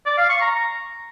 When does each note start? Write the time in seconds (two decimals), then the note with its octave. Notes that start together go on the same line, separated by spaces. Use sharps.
0.06 D5
0.18 F5
0.29 C#6
0.41 A#5